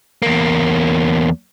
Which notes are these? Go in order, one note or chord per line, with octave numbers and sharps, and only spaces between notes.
E2 A#3